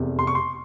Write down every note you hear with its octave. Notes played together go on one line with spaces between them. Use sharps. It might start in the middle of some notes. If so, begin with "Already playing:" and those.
Already playing: F1 E2 C3
C6
C#6
C6